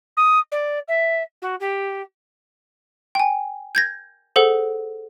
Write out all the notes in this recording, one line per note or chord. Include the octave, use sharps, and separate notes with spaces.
D#6
D5
E5
F#4
G4
G5 G#5
G6 G#6 A#6
G#4 A4 C5 F#5